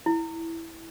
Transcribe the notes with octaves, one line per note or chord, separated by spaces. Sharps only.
E4